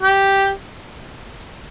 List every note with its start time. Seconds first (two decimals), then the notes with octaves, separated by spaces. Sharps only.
0.01 G4